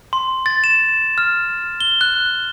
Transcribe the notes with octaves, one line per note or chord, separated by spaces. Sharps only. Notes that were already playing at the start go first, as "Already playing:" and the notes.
C6
A6
E7
F6
G7
F#6